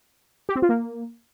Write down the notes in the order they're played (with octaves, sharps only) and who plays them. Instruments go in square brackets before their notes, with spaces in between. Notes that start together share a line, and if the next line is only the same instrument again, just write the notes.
[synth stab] G4
C4
F4
A#3